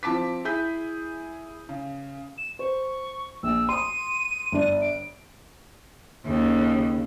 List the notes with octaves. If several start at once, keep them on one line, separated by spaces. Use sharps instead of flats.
F3 C4 A5 D6 B6
E4 G#4 G6 B6
C#3
E7
C5 C#6
A#1 E6
C6 D#6 D#7
G1 D4
D7
D#2 C#3